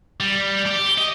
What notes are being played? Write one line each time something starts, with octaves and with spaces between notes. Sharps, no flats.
G3
G4
D#5